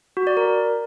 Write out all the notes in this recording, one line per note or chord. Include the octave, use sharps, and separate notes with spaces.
F#4
D5
A#4